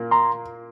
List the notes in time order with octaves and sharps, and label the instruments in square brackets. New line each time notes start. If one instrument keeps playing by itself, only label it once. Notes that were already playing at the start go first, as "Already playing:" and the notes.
Already playing: [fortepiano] A#2 A#3
[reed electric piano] A#5 C6